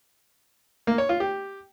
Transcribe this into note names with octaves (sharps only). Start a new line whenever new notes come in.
A#3
C#5
F4
G4